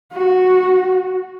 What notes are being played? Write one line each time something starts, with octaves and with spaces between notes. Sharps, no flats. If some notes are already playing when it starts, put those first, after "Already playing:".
F#4